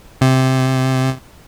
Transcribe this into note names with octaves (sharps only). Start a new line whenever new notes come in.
C3